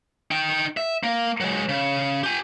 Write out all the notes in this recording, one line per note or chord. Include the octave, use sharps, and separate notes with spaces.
D#4 G5
E5
A#3
F#3 G#3
C#3
G4 G#5